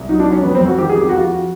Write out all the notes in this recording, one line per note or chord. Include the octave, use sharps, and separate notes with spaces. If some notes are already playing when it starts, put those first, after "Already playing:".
Already playing: C2
F#3 D#4
D4
F#3
C#4
F2 B3
C4
F2
F#4
D#3 G4
G#4
F2
G4
F#4
F2 F4
F#4